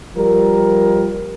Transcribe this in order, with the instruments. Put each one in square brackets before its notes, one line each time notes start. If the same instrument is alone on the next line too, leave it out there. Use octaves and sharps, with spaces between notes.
[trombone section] F3 G3 A#4